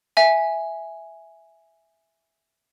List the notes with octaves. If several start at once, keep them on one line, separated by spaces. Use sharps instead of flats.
E5 G#5